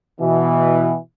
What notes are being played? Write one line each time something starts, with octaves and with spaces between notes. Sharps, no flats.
B2 E3